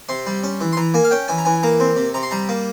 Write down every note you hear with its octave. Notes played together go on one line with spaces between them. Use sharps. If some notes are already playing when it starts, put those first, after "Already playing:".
C3 C6
G3
C#4
E3
C6
E3 A#5
A#3 G#5
F5
C#4 G5
E3 G#5
A#5
E3 G#5
A#3 A#5
C4
C3
C3 A#5
C6
G3 A#5
A#3